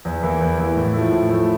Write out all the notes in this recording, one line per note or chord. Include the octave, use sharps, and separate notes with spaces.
E2
E3 A#3 E4
E2
E3 A#3 E4
A2
F3 A3 E4
A2
F3 A3 E4